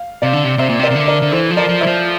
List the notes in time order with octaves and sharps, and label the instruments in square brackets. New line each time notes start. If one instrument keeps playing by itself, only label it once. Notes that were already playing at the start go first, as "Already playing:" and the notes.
Already playing: [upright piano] F5
[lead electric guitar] C3 [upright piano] D5 F5
[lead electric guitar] D3
C3
[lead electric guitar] C3 [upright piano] C5 E5
[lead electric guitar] A#2
C3
[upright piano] A#4 D5
[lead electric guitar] C3
D3
[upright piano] A#4 D5
[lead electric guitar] D3
[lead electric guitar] E3 [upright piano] A4 C5
[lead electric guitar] F3
[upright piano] A#4 D5
[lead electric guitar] F3
[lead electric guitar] E3 [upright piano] C5 E5
[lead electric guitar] F3